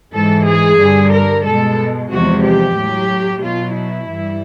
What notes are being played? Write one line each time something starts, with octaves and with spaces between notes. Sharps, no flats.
G#2 E3 G#3 A4
G#4
G2 D3 G3
A#4
B2 G#3 A4
E2 C3 F3 G#3 F#4
G4
A2 F#3
B2 F#3 F4
E4
G2 E3 G3